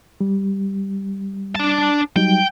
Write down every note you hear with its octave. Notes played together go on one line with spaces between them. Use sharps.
G3
D4 A5
F#3 G3 D#4 G5